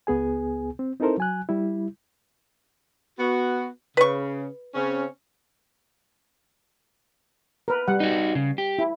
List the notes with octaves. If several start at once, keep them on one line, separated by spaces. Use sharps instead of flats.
C#2 B3 G#4 G#5
C4
C4 D#4 E4 A4 A#4 C5
F#3 G#5 F#6
G3 E4
B3 F#4
C#3 B4 C#6
C#3 C4 C#4
A#4 B4
G3 F#5
D#4 F#4
C#3
G4
E4